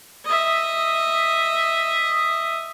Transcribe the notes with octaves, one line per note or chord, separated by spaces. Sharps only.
D#5 E5